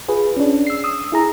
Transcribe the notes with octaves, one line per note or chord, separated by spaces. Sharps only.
F4 G#4 B4
C#4 D4
E6 C7
D#6 E6
E4 G#4 A#5